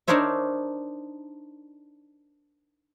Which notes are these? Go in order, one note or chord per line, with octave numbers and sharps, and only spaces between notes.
D4 D#4 A#4 C5 C#5 E5